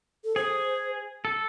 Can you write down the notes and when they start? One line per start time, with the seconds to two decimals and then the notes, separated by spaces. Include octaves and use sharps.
0.24 A4
0.36 G#4 C5
1.25 A4